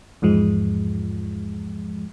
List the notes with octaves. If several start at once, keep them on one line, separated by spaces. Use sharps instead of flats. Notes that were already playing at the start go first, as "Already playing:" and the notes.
E2 G#2 F3 G#3